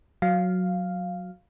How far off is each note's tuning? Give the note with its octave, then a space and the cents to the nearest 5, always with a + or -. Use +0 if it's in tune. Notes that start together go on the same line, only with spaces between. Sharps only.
F#3 -10 F5 +0